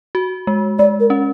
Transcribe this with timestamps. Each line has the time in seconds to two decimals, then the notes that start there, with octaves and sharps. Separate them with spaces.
0.15 F#4
0.47 G#3
0.79 G#3 D5
1.00 A#4
1.10 C#4